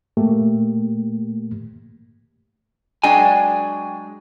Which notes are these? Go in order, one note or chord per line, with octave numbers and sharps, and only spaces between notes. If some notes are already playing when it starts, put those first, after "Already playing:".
A#2 A3 A#3 G4
F#3 G#3 D4 G5 G#5